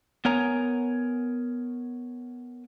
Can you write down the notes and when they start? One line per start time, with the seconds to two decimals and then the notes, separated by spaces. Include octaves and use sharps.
0.25 B3 A#4 C#5 G#5 A#5